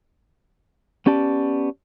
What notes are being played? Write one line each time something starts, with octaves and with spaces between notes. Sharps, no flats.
B3 C#4 G4 D5 A5